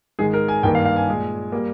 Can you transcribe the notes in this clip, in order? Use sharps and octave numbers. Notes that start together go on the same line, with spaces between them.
G#2 D#3 G#3 G#4
A#4
G#5
G2 D#3 A#3 G5
F5
F5
G#5
A#2 G#3
G3 A#3